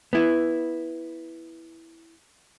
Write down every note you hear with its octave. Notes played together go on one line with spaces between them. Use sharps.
B3 E4